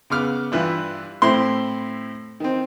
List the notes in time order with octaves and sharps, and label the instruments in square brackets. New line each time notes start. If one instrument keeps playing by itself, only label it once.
[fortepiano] C#3 B3 D6 F6
G2 E3 E4 F4
A2 C4 E4 C6
D#3 C4